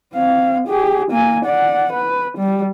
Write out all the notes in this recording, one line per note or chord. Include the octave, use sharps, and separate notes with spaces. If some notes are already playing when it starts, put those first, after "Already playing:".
C4 F5
G4 G#4
A#3 G#5
D5 F#5
B4
G3